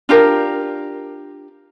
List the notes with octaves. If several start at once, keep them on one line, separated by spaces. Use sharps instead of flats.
D4 F4 G4 A#4